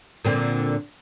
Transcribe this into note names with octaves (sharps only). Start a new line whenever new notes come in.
A#2 D3 C4